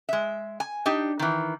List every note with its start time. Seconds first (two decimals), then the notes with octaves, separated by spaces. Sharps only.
0.09 G#3 E5
0.60 G#5
0.86 D4 D#4 G4
1.19 D#3 E3